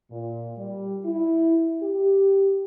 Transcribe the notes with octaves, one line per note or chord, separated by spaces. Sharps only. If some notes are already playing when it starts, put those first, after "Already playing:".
A#2
G3
E4
G4